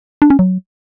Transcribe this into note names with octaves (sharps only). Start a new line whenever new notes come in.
D4
C#4
F#3